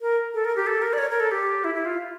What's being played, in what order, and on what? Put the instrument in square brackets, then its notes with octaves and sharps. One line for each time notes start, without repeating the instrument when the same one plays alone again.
[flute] A#4
A4
A#4
G4
A4
A#4
D5
C#5
A#4
A4
G4
E4
E4
F4